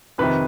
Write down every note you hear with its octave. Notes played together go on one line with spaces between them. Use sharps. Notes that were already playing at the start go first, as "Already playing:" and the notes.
F2 C3 D#3 B4